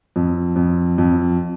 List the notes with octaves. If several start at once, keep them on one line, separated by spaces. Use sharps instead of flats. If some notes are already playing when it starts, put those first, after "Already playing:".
F2
F2
F2